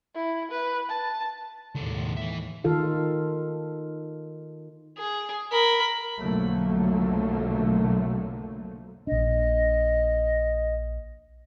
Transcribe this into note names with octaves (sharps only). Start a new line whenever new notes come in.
E4
B4
A5
D#2 A2 D#3 G#3 A4
E3 E5
D#3 F4 A4 F5
G#4
A#4 B5
B1 F2 D3 F#3 A3 A#3
A#1 D4 D#5